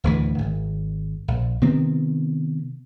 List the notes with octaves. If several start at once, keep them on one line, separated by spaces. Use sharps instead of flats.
D1 D2 E3
G#1
A#1
C3 D#3 B3 C4